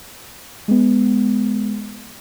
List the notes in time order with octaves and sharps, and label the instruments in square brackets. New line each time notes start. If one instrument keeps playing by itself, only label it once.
[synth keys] G#3 B3